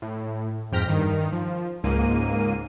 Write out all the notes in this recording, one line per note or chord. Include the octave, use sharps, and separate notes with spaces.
A2
F2 G#2 G5 F6 A#6 B6
G2 D#3
F3
C#2 G#2 A#3 D#7